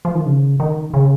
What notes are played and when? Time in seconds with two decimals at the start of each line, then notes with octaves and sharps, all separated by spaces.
0.05 F3
0.15 D#3
0.26 C#3
0.60 D#3
0.94 C#3